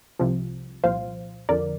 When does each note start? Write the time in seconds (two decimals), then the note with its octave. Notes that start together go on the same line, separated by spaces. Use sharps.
0.19 C2 C3 F3
0.84 C2 A#2 F3 C5 F5
1.49 F2 D3 F3 A#4 D5